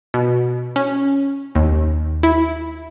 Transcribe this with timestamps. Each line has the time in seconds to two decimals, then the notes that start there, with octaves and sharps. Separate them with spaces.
0.14 B2
0.76 C#4
1.55 D#2
2.23 E4